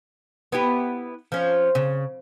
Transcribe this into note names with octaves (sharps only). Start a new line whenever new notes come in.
B3 E4 G4
F3 C#4
C#3